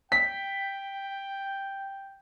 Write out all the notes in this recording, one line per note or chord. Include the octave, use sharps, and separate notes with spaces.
G5 B6